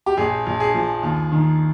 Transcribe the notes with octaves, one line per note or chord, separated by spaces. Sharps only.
G4
A#1 G#4
A#1
G#4
F3
D#2
D#3